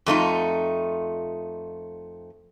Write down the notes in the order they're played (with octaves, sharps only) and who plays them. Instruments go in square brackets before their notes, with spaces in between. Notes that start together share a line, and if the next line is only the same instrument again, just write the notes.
[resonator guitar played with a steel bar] F2 A3 D#4 F4